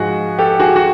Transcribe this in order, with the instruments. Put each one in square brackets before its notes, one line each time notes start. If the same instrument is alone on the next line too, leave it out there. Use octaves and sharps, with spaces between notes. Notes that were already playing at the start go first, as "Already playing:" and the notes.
Already playing: [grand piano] G#2 F3 G#3 F#4 G#4
G4 A4
F#4 G#4
F#4